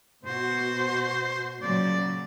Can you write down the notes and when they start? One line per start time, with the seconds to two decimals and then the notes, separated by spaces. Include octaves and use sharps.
0.25 B2 F#4 C5
1.62 A#2 C#3 F#3 D5